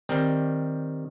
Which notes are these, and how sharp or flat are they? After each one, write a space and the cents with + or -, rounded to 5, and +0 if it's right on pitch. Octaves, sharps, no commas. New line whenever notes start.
D#3 +0 G3 +0 C4 +0